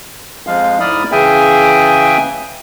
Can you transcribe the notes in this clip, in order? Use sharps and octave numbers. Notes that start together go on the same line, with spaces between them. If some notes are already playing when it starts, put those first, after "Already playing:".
F2 F3 G#3 F5
G#2 E4 D5 B5 D#6 F6
C#3 E3 G#4 E5 G5 G#5